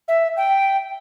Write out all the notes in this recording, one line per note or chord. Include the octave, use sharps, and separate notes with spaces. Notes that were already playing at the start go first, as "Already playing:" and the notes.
E5
G5